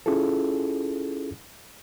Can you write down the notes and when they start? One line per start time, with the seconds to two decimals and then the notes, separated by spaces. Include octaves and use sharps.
0.06 C#4 E4 F4 G#4 A4